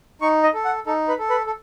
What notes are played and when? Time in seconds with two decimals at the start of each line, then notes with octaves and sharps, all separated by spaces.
0.21 D#4 C#6
0.43 D#5
0.54 A4
0.65 F#5
0.86 D#4 A4
1.08 B4
1.19 A4
1.30 B4
1.46 A4